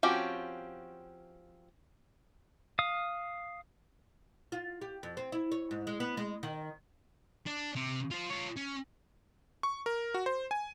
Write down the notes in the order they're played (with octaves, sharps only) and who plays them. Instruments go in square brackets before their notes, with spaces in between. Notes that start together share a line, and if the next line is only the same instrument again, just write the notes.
[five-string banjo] F3 C4 C#4 F#4 G4
[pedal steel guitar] F5 D#6
[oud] F4
G4
F2
C4
E4
C#5
G#2
G#3
B3
G#3
D#3
[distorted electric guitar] D4
C3
F4 C5
F4 C#5
C#4
[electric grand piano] C#6
A#4
F#4
C5
G#5